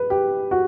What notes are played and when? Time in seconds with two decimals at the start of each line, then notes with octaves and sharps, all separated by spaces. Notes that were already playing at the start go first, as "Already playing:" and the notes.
Already playing: B4
0.10 G4
0.51 F#4